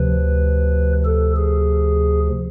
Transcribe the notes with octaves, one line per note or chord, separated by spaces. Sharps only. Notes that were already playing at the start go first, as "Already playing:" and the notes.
Already playing: D2 C3 F3 B4
A4
G#4